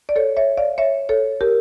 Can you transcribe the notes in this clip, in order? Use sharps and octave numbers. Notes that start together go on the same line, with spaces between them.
D5
A4 C#5
C#5 E5
D5 F5
C#5 E5
A4 C#5
G4 A#4